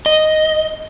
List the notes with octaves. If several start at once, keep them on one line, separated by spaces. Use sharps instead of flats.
D#5